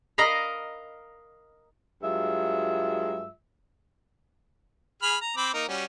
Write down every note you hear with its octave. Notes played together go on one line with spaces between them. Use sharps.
A#4 D#5 F5 A#5 B5
G2 F#3 G#3 F4 E5
G#4 B5 F6
A#5
C4 B5 D6
A#3 D#4 A#4
G3 C#4 F#4